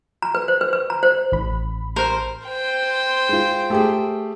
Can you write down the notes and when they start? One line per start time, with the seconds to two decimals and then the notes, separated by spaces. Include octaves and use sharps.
0.22 A#5
0.35 B4
0.48 C5
0.61 B4
0.73 B4
0.90 A#5
1.03 C5
1.32 A1 B5
1.96 A#4 C5
2.47 C5 G5
3.29 G#3 F4
3.70 A3 G4 G#4